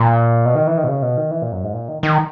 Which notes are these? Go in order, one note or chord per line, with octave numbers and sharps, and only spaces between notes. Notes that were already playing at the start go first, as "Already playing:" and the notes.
Already playing: A#2
B2
D#3
E3
D#3
B2
C#3
B2
D#3
E3
A#2
F#2
G#2
A#2
D#3
D#3